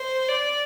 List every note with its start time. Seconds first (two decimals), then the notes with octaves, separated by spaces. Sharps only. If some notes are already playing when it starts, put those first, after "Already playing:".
Already playing: C5
0.28 D5